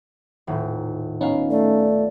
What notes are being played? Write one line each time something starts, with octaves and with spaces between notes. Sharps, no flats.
D#1 A2
B3 C#4 D#4 F5
A3 D5